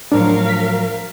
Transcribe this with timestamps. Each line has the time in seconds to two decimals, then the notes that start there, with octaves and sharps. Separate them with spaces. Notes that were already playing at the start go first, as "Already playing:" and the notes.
0.12 A2 F3 F#3 D4 A#4 F5
0.49 B6